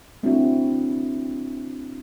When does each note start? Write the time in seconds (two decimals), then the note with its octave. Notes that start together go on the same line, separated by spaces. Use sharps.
0.23 A3 C4 D4 E4 F#4